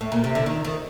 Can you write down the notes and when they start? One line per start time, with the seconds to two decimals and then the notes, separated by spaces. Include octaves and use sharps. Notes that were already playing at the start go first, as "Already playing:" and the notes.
0.01 A2
0.12 A#2
0.24 C3
0.35 D3
0.46 D#3
0.65 D#3